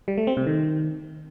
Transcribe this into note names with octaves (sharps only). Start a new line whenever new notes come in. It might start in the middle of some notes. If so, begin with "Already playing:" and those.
G3
A3
C4
C3
D#3